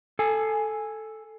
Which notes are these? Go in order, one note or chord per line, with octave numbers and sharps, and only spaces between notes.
A4 G#5